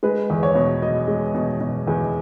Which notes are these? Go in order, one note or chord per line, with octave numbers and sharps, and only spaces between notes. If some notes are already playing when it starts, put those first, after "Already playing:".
G#3 B4
E2
C#5
B2
B2 D#5
G#3
B2
B2
E2